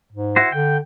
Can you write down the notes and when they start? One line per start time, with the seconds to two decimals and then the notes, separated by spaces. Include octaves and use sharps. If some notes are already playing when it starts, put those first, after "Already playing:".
0.12 G#2
0.36 E4 F#4 C5
0.52 D3 G5